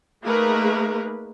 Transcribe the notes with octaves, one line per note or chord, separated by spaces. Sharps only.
A3 A#3 D#4 G#4 A#4 B4